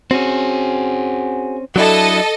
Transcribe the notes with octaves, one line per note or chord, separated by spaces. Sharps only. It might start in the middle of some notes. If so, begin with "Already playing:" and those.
C4 C#4 F#4 G#4
F#3 D4 E4 A4 D#5